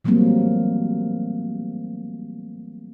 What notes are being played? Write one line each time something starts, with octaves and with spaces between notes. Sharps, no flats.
E3 F#3 G3 A3 A#3 C4